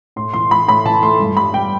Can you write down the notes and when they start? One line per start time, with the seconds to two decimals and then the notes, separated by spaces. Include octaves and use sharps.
0.16 A2 C6
0.34 E3 C6
0.51 E3 B5
0.68 A2 B5
0.85 E3 A5
1.02 A3 C6
1.20 G2
1.37 G3 B5
1.53 G3 G5